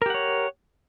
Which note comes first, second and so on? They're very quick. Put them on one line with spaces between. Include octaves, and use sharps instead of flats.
A#4 G4 F#5 C#5